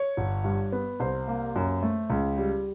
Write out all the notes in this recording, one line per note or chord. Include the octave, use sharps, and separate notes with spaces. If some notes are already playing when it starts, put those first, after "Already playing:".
Already playing: C#5
G1
G2
B3
C2 C5
A#3
F#2
A3
C#2
G3